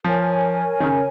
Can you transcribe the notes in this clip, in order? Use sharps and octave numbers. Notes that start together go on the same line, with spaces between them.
F3 A#4 C#5 G#5
D#3
C#3